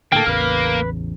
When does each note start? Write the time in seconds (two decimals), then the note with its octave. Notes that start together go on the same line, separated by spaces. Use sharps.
0.12 A2 D3 A#3 A4 G5
0.26 A1 E2 C#3 B4 F6